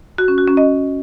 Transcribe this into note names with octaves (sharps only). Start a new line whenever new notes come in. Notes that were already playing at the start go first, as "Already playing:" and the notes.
F#4
C#4
F#4
C#4
D#5